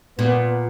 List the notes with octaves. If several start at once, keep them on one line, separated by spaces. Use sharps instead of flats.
A#2 B3